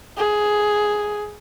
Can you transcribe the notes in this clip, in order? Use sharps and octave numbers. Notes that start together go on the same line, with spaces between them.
G#4